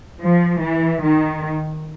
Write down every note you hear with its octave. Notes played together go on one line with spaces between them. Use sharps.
F3
E3
D#3